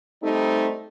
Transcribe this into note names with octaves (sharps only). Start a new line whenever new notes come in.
G3 A3 C4 D#4